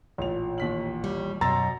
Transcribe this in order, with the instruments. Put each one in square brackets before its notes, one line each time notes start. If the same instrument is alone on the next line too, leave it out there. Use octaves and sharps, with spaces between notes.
[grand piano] A1 A#2 F7
[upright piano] D#2 B6 F#7
[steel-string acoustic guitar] G3
[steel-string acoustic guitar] F#2 B2 [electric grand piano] A#5 [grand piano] C6 E6 A6